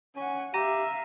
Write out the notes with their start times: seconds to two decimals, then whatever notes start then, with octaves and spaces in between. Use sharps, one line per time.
0.16 C#4 F#5 G#5
0.54 G4 E5 F5 A#5 A#6 D#7